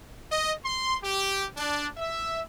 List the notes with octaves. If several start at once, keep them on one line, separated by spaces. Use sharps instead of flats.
D#5
C6
G4
D4
E5